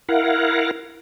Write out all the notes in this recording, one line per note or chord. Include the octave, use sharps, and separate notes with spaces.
E4 A#4 F5 F#5